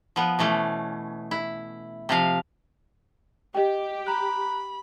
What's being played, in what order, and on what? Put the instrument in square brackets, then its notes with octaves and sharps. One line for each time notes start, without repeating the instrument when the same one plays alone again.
[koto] F3 B3
B2 E3 A3 C#4
E4
C3 F3 F5
[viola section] G4 [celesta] D#5 G5
[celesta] A#5 F#6 [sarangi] B5